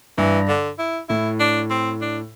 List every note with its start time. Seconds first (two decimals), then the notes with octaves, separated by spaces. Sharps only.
0.18 G2 E3
0.48 D3
0.79 E4
1.09 A2 E4
1.40 D4
1.70 C4
2.01 D4